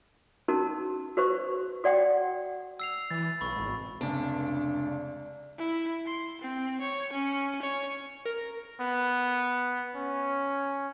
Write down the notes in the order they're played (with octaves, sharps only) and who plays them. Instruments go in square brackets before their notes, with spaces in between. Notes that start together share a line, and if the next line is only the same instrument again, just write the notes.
[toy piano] C#4 D#4 F#4 A#4 A5
F#4 B4 C5 C#6
F#4 D5 F#5 G5
[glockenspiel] E6 C7 F7
[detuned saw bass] E3 [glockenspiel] A6
[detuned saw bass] B1 [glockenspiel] B5 C#6
[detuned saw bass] G#1
[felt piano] F1 C#2 [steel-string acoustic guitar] D4
[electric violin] E4
C6
C4
C#5
C#4
C#5
[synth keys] A#4
[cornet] B3
C#4